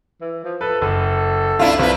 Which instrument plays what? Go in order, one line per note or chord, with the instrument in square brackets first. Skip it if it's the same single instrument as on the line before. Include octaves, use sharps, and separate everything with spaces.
[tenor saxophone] E3
F3
[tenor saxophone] A4 [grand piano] B4
[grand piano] F#1 [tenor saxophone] A4
[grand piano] C2 [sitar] D4 E4 F4
[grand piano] C2 [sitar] F3 B4